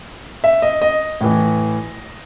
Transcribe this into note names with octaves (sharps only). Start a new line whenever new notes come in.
E5
D#5
D#5
A2 E3